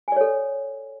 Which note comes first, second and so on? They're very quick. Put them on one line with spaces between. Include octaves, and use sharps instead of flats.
G#5 D5 C#5 A4